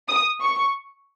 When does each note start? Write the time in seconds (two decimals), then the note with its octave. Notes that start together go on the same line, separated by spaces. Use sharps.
0.08 D#6
0.41 C#6